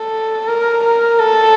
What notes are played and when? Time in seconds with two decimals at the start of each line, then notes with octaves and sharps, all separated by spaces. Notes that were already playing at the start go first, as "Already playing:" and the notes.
Already playing: A4
0.48 A#4
0.84 A#4
1.19 A4